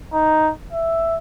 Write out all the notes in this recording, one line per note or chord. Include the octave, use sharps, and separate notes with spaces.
D#4
E5